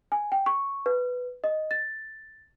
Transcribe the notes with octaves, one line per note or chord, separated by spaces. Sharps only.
G#5
G5
C#6
B4
D#5
A6